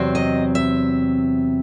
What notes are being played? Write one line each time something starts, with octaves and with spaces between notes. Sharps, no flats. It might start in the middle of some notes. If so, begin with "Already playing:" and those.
Already playing: E2 C3 F#3 C4
D#5
E5